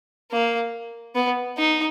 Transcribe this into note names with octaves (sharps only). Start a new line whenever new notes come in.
A#3
B3
D#4